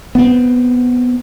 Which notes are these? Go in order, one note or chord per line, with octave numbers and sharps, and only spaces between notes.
B3 C4